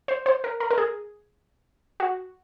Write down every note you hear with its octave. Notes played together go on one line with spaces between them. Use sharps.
C5
C5
A#4
A#4
A#4
G#4
F#4